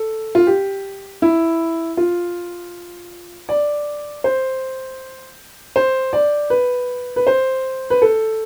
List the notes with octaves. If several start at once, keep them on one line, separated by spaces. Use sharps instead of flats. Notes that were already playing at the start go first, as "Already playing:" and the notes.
Already playing: A4
F4
G4
E4
F4
D5
C5
C5
D5
B4
B4
C5
B4
A4